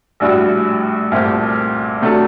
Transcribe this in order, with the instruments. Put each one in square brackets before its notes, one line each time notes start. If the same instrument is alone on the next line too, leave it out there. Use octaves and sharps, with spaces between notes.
[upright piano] A#1 A2 G3 D4 F#4
C2 A#2 A3 C4 G4
C3 F#3 A3 D4 A4